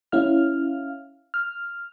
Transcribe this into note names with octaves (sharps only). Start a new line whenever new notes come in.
C#4 E4 F5 F6
F6